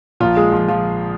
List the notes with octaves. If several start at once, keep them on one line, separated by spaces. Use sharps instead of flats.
A#1 A#2 F3 A#3 F4
G#3 G#4
F3 F4
F3 F4